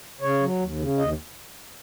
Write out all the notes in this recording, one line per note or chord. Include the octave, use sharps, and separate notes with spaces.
C#3 C#5
F#3
D#2
C#3
D#2 D#5